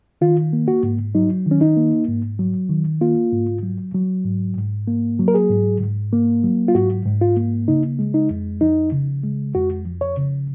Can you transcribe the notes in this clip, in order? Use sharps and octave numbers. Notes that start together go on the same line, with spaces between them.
D#3 F4
A#3
F#4
G#2
F#3 D#4
D#3
C#4
D#4
A#3
G#2
F#3
D#3
A#3 F4
G#2
F#3
F#3
G#2
G#2
A#3
F#3
A#4
G#4
G#2
G#2
A#3
F#3
F4
G#2 F#4
G#2
F4
A#3
C#3 D#4
G#3
D#4
F2
F3 D#4
C#3
G#3
F2 F#4
F3
C#5
C#3